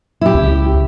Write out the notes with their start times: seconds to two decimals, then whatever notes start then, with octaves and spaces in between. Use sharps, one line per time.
0.21 E4 G4
0.35 C#2